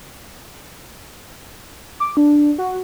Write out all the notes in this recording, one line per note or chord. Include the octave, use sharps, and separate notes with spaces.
D6
D4
F#4